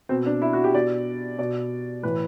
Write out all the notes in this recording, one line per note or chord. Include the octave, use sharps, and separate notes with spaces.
B2 C4
D4
E4
F#4
G4
B2 D5
B2 D5
A2 E3 B4